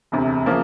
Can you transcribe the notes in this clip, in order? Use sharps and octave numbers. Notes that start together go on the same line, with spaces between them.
E1 D2 C3
C#3 F3 A#3